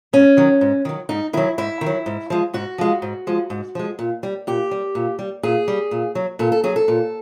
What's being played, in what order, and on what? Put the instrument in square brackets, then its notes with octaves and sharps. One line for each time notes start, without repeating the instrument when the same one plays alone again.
[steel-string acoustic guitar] G#2 C#4
D#3 F#3
G#2
D#3 F#3
G#2 D#4
D#3 F#3 E4
G#2 E4
D#3
F#3
G#2
F3 G#3
G#2 F#4
F3 G#3
G#2
F3 G#3
G#2
F3 G#3
A#2
G3
A#2 G4
G3
A#2
G3
A#2 G#4
G3
A#2
F#3
A#2 A4
A4
F#3 G#4
A4
A#2